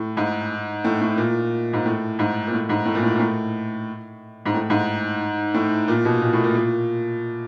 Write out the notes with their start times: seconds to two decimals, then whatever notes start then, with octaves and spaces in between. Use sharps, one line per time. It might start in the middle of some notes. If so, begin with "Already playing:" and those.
Already playing: A2
0.17 G#2
0.84 A2
1.01 A2
1.18 A#2
1.73 G#2
1.85 A2
2.19 G#2
2.47 A#2
2.52 A2
2.69 G#2
2.85 A2
2.95 A#2
3.03 A2
3.15 A#2
3.19 A2
4.46 G#2
4.54 A2
4.70 G#2
5.54 A2
5.88 A#2
6.05 B2
6.22 A#2
6.33 A2
6.44 A#2
6.55 A#2